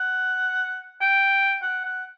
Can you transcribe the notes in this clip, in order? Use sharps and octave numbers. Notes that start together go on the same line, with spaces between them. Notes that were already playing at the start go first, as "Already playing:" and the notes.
Already playing: F#5
G5
F#5
F#5